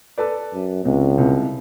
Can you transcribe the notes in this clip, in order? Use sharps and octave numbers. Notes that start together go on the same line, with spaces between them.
A4 B4 D5
F#2
C#2 C3
C2 C3